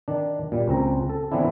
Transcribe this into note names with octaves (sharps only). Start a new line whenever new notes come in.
D#3 D4
A#2 G3
C#2 C4 A#5
A4
E3 B3 C4 D4 E4